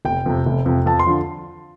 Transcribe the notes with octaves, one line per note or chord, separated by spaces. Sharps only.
F1 G5
F2 C3
F1
F2 C3
F2 A5
C6
D3 F3